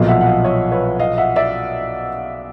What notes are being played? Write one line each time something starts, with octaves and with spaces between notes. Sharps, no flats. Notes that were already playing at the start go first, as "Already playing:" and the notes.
Already playing: B1 A#2 F3 D#5 F5
E5 F#5
F#5
D#5 F5
C#5 D#5
B4 C#5
D#5 F5
E5 F#5
D5 E5